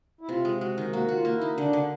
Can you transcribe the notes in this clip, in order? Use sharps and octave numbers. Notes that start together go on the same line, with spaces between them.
E4
C3 F4
G#3
G#3 F#4
D#3
A#3 F#4
F#4
F4
A#3
E4
D#4
D3 D4
D3